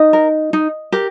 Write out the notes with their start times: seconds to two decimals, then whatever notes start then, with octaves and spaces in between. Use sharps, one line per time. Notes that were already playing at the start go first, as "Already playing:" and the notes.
Already playing: D#4 D#5
0.13 A#4
0.53 D#4
0.92 G4 A#4